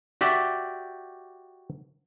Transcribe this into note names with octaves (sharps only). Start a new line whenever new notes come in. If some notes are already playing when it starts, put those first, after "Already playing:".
F#4 G4 D5 E5 G5